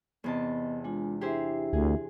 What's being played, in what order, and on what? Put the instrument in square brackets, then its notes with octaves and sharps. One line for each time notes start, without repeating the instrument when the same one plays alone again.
[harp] E2 C3 A5 [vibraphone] B3 D#5
[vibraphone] G#3 D4 F4
[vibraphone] D4 E4 E5 [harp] G4 G#4 C5
[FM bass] D2 [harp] G#4